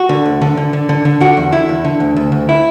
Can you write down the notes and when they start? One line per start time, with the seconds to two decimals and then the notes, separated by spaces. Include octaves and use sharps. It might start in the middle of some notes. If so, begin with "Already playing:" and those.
Already playing: F#4
0.09 D3
0.26 D2
0.42 D3
0.57 D3
0.73 D3
0.89 D3
1.05 D3
1.21 D3 F#4
1.37 E2
1.52 D3 E4
1.69 E2
1.85 D3
2.00 D2
2.16 D2
2.32 D2
2.49 E4